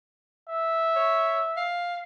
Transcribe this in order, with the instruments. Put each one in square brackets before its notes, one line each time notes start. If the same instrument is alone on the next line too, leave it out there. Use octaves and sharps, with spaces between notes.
[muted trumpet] E5
[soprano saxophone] C#5
F5